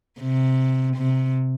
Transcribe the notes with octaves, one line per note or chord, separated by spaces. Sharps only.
C3
C3